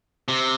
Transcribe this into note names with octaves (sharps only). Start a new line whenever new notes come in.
C3